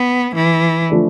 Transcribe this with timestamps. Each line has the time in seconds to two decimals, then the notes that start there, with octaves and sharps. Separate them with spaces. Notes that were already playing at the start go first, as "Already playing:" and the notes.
Already playing: B3
0.35 E3
0.89 F3 A3 D4